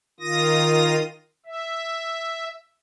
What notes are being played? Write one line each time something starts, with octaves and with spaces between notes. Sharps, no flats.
D#3 F4 D#6 A#6
E5